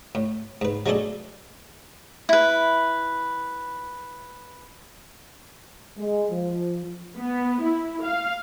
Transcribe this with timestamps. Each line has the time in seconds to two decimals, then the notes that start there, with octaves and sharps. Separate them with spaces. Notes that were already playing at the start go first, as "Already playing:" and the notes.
0.15 A2
0.61 G#2 B4
0.86 F#3 G#3 A3 D4 G#4 A4
2.29 E4 B4
5.98 G#3
6.30 F3
7.17 B3
7.62 E4
8.03 F5